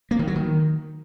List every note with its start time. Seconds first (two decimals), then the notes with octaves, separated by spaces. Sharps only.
0.11 A#3
0.19 D#3
0.27 F#3
0.36 D#3